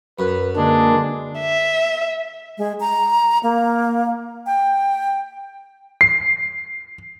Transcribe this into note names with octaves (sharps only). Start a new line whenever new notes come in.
F#2 B4
D3 G#3 A#3 D4
E5
G#3
A#5
A#3
G5
C7